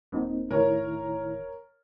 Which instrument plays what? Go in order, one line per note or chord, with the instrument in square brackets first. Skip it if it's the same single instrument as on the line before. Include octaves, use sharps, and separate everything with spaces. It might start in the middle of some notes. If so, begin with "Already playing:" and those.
[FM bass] D#1 [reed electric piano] A#3 C4 D#4
[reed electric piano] A2 D#3 E4 [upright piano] A#4 C#5